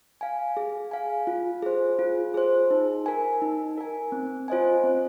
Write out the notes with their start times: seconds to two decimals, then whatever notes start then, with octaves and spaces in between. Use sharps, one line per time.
0.21 F5 G#5
0.57 G#4
0.91 F5 G#5
1.27 F4
1.62 G#4 C5
1.99 F4
2.34 G#4 C5
2.71 D#4
3.06 A#4 G#5
3.42 D#4
3.78 A#4 G#5
4.12 C4
4.48 F4 C5 D#5 G#5
4.84 C4